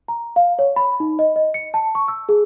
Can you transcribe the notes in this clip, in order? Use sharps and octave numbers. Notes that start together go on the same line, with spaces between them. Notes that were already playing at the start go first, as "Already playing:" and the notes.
A#5
F5
C#5
B5
D#4
D#5
D#5
C#7
A5
C#6
E6
G#4